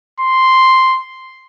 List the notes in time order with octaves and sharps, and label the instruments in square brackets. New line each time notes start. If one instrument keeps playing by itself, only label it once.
[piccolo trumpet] C6